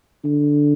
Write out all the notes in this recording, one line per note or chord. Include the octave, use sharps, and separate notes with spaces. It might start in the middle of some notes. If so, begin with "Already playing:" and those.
D3